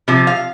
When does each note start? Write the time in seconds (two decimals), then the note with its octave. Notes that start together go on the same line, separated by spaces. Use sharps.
0.08 C3 F3
0.27 F5